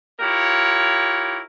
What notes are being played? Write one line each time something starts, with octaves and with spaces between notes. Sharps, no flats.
E4 F4 G4 A#4 C#5